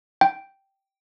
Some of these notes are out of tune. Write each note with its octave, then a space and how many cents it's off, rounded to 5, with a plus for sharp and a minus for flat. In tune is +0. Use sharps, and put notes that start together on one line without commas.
G5 -5